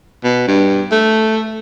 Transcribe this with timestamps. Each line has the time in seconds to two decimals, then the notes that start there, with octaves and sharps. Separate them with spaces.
0.24 B2
0.47 G2
0.92 A3